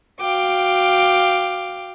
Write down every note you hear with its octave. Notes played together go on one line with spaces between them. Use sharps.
F#4 F5 G5 D6